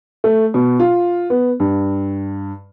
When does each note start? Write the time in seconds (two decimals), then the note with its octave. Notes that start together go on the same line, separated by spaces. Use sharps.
0.24 A3
0.54 B2
0.80 F4
1.30 B3
1.60 G2